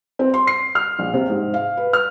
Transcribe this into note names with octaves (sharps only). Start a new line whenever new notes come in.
C4
C6
C7
F6
A#1
C3
G#2
F5
B4
F6